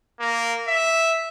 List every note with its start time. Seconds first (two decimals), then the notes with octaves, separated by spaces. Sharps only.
0.20 A#3
0.68 E5